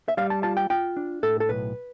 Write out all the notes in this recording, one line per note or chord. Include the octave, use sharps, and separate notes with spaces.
E5
G3 F5
A5
F4 A5
G5
F4 G5
D4
A2 A4
A4
B1 B4